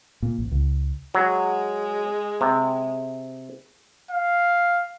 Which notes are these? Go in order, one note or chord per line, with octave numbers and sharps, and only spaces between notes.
A#2
A1
C#2
F#3 G#3
C3
F5